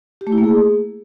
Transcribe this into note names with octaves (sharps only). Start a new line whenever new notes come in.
G4
A3
E4
A#3
G#4